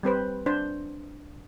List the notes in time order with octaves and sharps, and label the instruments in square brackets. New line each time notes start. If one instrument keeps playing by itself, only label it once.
[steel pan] G3 C4 B4 C5
D4 C5